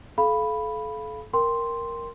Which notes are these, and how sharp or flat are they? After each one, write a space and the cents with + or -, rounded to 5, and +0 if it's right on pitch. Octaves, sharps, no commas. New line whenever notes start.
A4 -35 F5 -10 B5 +0
A#4 +0 G5 +0 C6 +0